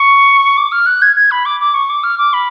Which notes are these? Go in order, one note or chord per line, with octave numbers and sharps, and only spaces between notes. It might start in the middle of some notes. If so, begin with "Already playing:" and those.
Already playing: C#6
D6
F6
F#6
G#6
G#6
B5
D6
D6
C#6
D6
F6
D6
B5